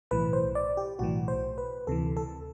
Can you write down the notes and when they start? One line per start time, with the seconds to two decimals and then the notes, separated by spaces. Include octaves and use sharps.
0.11 B1 A2 E3 B4
0.33 C5
0.55 D5
0.77 G4
0.99 B1 A2 E3 F#4
1.28 C5
1.58 B4
1.87 D2 C3 E3 A4
2.17 A4